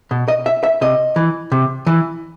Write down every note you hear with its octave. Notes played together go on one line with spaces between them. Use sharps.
B2
D#5
E5
E5
C3 D#5
E3
C3
E3